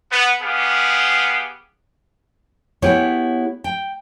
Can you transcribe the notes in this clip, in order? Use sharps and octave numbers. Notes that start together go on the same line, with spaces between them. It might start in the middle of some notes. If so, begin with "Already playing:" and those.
B3
B3 G4 G#4 F5
B3 E4 G4 G#4 C#5
G5